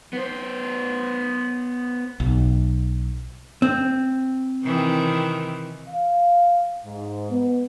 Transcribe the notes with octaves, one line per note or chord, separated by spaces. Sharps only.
B3 C5
B1
C4
C3 D#3 E3
F5
G#2
B3